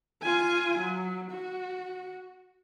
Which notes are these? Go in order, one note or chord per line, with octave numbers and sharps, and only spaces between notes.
F4 G#5
F#3
F#4